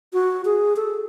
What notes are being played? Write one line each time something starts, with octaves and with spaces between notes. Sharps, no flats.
F#4
G#4
A4